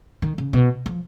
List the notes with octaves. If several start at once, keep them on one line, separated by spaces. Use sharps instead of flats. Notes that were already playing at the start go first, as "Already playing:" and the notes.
D#3
C#3
B2
F3